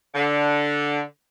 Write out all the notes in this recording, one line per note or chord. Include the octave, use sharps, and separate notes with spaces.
D3